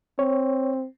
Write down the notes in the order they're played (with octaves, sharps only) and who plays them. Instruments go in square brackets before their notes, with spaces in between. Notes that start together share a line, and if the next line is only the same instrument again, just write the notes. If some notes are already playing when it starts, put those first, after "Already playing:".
[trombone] C4 [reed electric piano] C#5